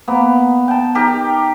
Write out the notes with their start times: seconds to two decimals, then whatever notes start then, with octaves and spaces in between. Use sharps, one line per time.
0.08 A#3 B3
0.68 G5 A5
0.95 D#4 G4 A#4